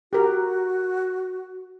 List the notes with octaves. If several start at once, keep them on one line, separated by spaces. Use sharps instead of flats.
F#4 G4 A#4